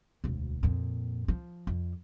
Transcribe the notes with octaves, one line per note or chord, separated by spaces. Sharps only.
E1 D2
F2 A#2
F3
F2